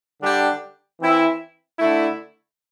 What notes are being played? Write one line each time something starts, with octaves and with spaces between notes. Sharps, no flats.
D3 G3 D4 G4
E3 C4 E4
D3 A3 E4